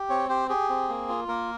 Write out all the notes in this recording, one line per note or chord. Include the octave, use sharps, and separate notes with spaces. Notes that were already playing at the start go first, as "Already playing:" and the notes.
Already playing: G4
C4 C#5
G4 C5
G4 G#4
C4
A#3
F4
A#3 A#4